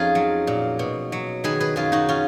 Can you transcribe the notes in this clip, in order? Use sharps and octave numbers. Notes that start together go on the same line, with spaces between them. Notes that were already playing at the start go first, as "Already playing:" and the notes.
Already playing: F2 C#4 D#4 F4 G#4
F#3
A#2
B2
F#3
D#3 G#4 B4
G#4 B4
F#2 F4 G#4
D#4 F#4
C#4 F4